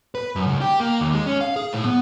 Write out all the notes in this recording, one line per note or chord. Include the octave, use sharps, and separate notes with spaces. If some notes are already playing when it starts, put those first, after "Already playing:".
B4
F#2
C#2
G4
A#3
D#2
G#3
C#4
F5
G#4
A2
B3